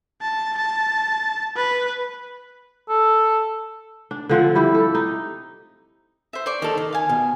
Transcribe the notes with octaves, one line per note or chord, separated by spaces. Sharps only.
A5
A5
B4
A4
D4
D3 F3 C4 F#5
G3 E4 G4
A4
D#4
C5 E5
C5 D5 C#6
D#3 A4
D#3
F5 G#5
B2